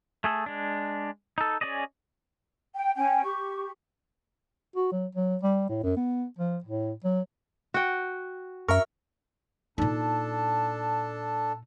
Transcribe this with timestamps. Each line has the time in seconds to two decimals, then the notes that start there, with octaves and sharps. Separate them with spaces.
0.24 A3 G#4 A4
0.46 G#3 D4
1.38 D#4 A4
1.61 C#4 G#4 D5 D#5
2.74 G5
2.95 C#4 G5 G#5
3.23 G4 C#6
4.76 F#4
4.92 F#3
5.15 F#3
5.43 G3
5.69 A2
5.83 F#2
5.97 B3
6.38 F3
6.64 A2
7.04 F#3
7.74 F#4 G5
8.68 F#2 A#4 E5 A#5 C#6
9.78 A#2 D4 D#4 A4